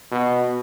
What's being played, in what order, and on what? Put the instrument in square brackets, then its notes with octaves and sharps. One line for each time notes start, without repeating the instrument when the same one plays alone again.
[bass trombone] B2